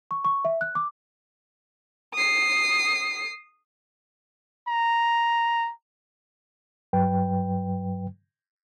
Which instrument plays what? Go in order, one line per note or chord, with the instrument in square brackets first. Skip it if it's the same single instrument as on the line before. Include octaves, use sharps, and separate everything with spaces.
[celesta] C#6
C#6
E5
F#6
D6
[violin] D#6 C7
[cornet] A#5
[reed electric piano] G2 F#3 B4 G5